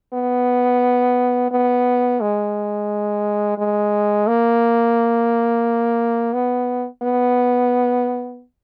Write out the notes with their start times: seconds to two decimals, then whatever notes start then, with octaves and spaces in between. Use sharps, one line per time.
0.13 B3
1.51 B3
2.21 G#3
3.58 G#3
4.27 A#3
6.33 B3
7.03 B3